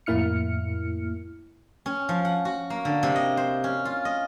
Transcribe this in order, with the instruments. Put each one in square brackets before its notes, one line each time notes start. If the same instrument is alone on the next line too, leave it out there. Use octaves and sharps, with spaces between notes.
[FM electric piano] F2 A2 A#3 E4 F6 C#7
[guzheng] C#4
F3
F#5
F#4
A#3
D3
C3
D#5
C5
C#4
F4
D#5